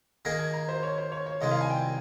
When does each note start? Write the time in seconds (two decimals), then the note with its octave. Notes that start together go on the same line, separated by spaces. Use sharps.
0.25 D#3 A#3 D#4 G#4 A#6
0.39 G#6
0.54 A#5
0.69 C5
0.83 C#5
0.98 C5
1.12 C#5
1.26 C#5
1.41 C2 C3 D#3 G#3 D#5
1.51 F5
1.61 G#5
1.70 G5